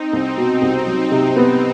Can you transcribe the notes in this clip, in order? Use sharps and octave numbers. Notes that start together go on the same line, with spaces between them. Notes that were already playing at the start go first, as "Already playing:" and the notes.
Already playing: C4 D#4
C2 D#4
B2
D#4
C2
F#3
C3
B3